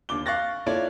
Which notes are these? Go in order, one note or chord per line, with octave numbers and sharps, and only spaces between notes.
D#2 D4 D6 G7
F5 C#6 F#6 A6 A#6
A#3 E4 F4 A4 C#5 D5